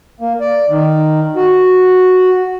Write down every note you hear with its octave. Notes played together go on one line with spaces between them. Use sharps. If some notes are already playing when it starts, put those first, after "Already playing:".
A#3
D5
D#3
F#4